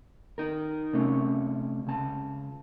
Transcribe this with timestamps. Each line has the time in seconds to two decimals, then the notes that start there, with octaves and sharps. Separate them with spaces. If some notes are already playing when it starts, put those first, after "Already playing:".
0.38 D#4 A#4
0.93 C3 A3 C#4
1.87 C#2 A5